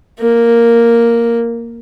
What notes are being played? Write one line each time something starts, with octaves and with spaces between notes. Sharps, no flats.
A#3